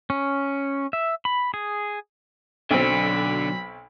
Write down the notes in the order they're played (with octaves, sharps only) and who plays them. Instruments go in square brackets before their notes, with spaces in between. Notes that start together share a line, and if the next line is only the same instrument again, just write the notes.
[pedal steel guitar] C#4
E5
B5
G#4
[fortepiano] B1 C4 [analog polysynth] B2 F#3 [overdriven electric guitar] D3 [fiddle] B5